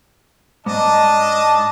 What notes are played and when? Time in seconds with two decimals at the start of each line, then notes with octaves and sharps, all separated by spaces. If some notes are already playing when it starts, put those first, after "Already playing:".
0.66 G#2 D4 D#5 A5